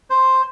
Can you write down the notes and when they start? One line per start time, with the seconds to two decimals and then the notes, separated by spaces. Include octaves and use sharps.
0.10 C5